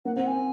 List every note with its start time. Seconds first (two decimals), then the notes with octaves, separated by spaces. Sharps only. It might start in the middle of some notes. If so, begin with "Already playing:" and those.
0.05 A#3 F#5
0.16 C4 F#5
0.27 G#5